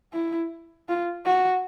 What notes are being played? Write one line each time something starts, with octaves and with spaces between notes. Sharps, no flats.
E4
F4
F#4